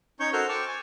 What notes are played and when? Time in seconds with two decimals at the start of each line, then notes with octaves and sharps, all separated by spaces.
0.20 C#4 D#4 C#5 C#6 G6
0.33 F#4 A4 A#4 C5 F6 G6
0.49 G5 A5 C#6 D6 F6
0.68 G#5